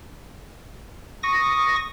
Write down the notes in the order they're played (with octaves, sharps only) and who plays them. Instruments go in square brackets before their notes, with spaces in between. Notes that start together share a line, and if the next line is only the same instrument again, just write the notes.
[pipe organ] C#6 D#6 A#6